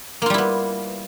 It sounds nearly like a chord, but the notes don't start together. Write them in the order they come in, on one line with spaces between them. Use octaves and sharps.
A#3 F4 G3 E4 B3